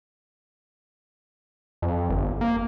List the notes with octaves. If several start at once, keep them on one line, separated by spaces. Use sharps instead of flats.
F2
G1
A#3